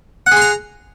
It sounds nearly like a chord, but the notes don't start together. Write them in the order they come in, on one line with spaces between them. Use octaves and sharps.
F#5 G#4 C6 A#5